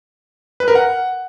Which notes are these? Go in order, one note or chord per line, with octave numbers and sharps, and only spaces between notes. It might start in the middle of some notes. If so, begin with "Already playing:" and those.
B4
A#4
F#5